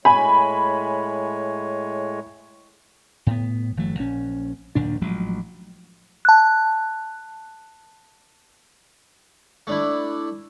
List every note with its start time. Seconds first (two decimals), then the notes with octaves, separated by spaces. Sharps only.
0.05 A2 G#3 C#5 G#5 B5
3.26 A2 B3
3.77 G1 E3 F#3 A3
4.00 A#1 C#4
4.75 F#1 D#2 A#2 D4
5.01 A1 F3 F#3 G#3
6.25 A5 F#6
9.67 A3 D4 E4